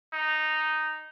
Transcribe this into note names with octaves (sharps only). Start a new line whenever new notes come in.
D#4